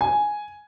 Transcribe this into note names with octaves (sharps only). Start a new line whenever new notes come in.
G#5